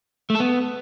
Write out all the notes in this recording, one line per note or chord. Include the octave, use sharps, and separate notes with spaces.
A3
A4
B3